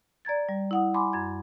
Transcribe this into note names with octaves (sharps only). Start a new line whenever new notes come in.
D5 A#5 G#6 A6
G3
E4 F#5 D#6
G#5 B5 C6 D6
F#2 G#6